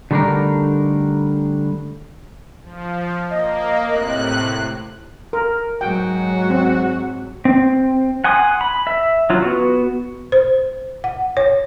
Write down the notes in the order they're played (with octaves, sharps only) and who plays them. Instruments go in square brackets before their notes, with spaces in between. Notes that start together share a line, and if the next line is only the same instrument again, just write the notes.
[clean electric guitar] D3 G3 A3 D4 D#4 A#4
[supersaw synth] F3
[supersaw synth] A#3 [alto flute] D#5
[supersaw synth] A2 C3 F#6
[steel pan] A#4
[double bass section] G#2 F#3 [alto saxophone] F#4 [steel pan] G5
[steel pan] C4
[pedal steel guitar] C4
F#5 G#5 C6 D#6
B5
E5
F#3 F4
B3 F#4
[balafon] C5
F#5
C#5